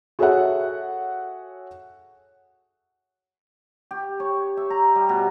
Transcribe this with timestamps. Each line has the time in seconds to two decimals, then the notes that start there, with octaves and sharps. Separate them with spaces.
0.19 F#4 G#4 A4 C#5 E5 F#5
3.91 G4
4.20 C#5
4.57 E5
4.70 A#5
4.95 G3
5.09 B2